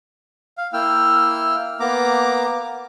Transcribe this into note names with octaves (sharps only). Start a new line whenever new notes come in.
F5
A#3 E4 G5 E6 F6
A#3 B3 A#5 D6